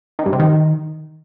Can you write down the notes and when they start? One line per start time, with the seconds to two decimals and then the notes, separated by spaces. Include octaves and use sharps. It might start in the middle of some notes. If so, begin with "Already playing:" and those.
0.19 D#3
0.26 G2
0.33 C3
0.40 D#3